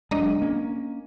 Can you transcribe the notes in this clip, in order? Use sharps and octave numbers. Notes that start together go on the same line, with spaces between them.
E1 F#3 G#3 D4 D#5 A#5
A#3 C#4